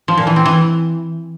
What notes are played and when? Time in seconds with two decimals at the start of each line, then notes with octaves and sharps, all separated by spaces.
0.08 F3
0.18 A#2
0.27 E3
0.36 C4
0.46 E3